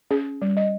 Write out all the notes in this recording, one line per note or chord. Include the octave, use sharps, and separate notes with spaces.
C#4 G#4
G3
D#5